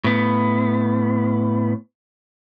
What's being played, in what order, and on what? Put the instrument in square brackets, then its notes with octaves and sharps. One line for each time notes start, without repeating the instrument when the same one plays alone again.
[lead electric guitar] A2 B3